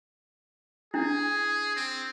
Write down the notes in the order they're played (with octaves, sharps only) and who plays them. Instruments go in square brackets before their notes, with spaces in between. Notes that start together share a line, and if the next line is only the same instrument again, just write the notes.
[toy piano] D4 E4 [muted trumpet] G#4
[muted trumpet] C4